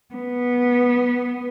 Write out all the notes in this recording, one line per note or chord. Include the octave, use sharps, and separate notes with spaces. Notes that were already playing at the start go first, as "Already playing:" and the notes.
B3